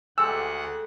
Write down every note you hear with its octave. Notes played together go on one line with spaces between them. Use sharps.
D2 G#3 G4 A4 F#5 G#5 E6